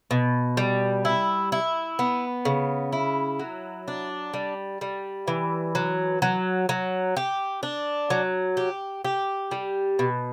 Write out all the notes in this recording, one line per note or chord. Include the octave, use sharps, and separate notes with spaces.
B2
G3
E4
E4
B3
C#3
E4
F#3
D4
G3
G3
E3
F#3
F#3
F#3
G4
D4
F#3
G4
G4
G3
B2